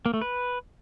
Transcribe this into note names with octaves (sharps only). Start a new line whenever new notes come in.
A#3
A3
B4